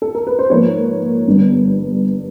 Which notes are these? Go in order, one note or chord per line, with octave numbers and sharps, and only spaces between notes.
A4
A#4
B4
C5
G#2 F3 A#3 B4 C#5
G1 G2 D3 G3 B3